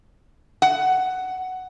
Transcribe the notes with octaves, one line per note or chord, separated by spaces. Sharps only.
F#5